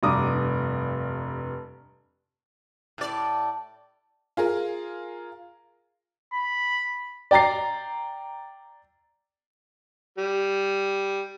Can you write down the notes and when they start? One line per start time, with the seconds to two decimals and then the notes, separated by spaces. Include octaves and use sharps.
0.03 F1 G2 A#5 D6 D#6
2.98 A2 D5
4.37 F4 G#4 A#4
6.33 B5
7.31 D5 G5 A#5 A6 C7
10.18 G3